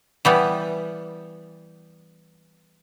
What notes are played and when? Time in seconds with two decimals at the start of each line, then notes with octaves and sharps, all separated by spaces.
0.25 E3 G3 B3